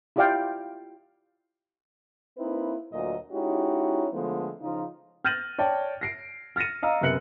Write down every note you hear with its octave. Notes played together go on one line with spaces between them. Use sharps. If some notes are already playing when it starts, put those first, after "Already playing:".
E4 F4 G4 D5 F5 G5
A#3 C4 D#4 E4 B4
D2 A#2 F#3 D#5
G#3 C#4 D#4 E4 F#4 G4
D3 F3 G#3 A3 B3
C#3 F3 D#4 F4
F6 G6 A6 A#6 D#7 F#7
C#5 D5 G5 A5
A#6 C7 D7
F6 A6 A#6 C#7 D#7
D#5 F5 A#5 E6
F#2 C3 B3 F#6 C#7 F#7